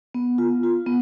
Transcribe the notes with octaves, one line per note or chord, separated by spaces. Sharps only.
B3
F4
F4
B3